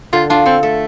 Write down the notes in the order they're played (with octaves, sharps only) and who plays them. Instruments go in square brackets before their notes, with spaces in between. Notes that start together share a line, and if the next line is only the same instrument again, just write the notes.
[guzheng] D3 [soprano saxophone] F4
[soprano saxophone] D4 [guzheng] F4
[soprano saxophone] C4 [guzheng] A4
[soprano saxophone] A3 [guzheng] A4